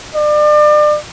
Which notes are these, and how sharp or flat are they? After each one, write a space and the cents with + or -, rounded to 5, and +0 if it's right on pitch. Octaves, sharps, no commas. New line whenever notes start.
D5 +35